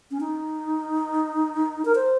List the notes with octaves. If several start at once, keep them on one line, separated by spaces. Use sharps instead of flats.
C#4
D#4
A#4
C5